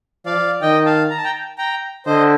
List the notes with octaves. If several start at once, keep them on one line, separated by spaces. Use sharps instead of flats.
F3 D5 F5
D#3 D#5 G5
F5 A5
A#5
A5
G5 A#5
G5 A#5
D3 C5 D#5